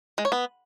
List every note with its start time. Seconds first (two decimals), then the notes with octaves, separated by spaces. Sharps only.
0.18 G#3
0.25 C#5
0.32 B3